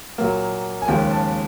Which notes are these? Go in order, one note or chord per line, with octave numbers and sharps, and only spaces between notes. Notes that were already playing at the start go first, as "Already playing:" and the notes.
A#2 F#3 A#3
G#5
D#2 C#3 F3 G#3 G5
A5